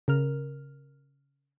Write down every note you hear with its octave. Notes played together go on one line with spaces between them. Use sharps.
C#3 A#4 F6